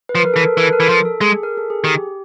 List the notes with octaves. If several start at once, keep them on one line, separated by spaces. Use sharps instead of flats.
B4
F3
B4
A#4
A4
E3
A#4
E3 B4
A4
A#4
E3
F3
A4
G#3 G#4
A#4
A4
G#4
D#3 G4